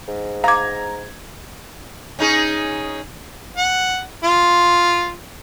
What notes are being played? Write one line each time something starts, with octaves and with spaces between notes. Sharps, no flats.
G#2
F5 A#5 D6 G#6
C#4 D#4 G#4
F#5
F4